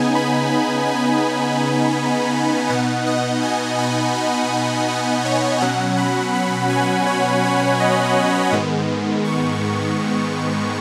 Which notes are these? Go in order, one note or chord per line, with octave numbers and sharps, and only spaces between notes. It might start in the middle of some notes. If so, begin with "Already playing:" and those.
Already playing: C#3 B3 D#4 G#5
B5
B5
G#5
B2 B3 D#4 F#5
D#5
G#5
B5
B5
B5
F#5
C#5
B2 F#3 C#4 F#5
B5
B5
G#5
C#5
C#5
D#5
G#2 D#3 G#3 B3
C#6